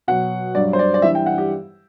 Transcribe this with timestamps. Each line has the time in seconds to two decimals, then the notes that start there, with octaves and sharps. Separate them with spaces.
0.08 B2 F#3 F#5
0.55 G2 F#3 D5
0.73 C5
0.79 D5
0.94 D5
1.02 G2 E3 G3 E5
1.15 G5
1.26 F#5
1.38 G4